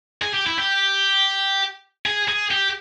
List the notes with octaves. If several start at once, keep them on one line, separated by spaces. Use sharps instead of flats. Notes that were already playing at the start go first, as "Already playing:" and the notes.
G#4
G4
E4
G4
G#4
G#4
G4